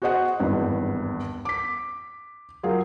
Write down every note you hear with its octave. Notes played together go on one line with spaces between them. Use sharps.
F#4 G#4 C5 D#5 F#5
G#1 E2 G2
D6 B6
F#3 F4 G#4 A#4